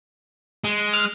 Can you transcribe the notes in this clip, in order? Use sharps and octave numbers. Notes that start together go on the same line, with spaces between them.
G#3
F6